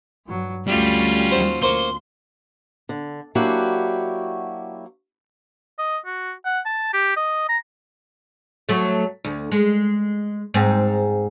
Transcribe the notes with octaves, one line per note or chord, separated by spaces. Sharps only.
G2 F#3
D2 G3 A3 C#4 F4 F#4
D#2 F#3 C5
D2 A#3 C5 C6 C#6
D3
F#3 A#3 D4 E4 F#4 G4
D#5
F#4
F#5
A5
G4
D#5
A#5
F#3 A3
D2
G#3
G#2 C4